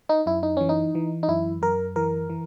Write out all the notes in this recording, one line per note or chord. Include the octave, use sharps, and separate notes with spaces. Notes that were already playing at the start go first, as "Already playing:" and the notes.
D#4
F#2 E4
D#4
E3 C#4
D#4
E3
D#4
F#2 E4
F#2 A#4
E3 A#4
E3